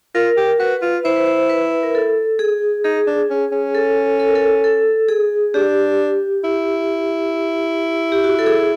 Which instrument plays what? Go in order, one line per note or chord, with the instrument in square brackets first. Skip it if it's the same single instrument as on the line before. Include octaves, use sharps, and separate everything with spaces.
[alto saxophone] F4 [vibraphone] A#4
[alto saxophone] G4
[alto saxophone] F#4 [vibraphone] B4
[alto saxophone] F4
[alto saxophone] E4 [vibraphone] C5
[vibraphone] B4
C5
B4
A#4
A4
G#4
[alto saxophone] D#4 [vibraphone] G#4
[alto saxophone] D4
C#4
C#4
[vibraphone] A4
A4
A#4
A4
A4
G#4
[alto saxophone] D4 [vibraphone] G4
[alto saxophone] E4
[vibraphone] G4
F#4
A4
G#4